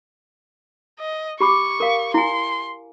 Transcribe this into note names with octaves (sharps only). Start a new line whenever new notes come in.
D#5
G4 B5 C#6 D6
A#4 F5
E4 G#5 C6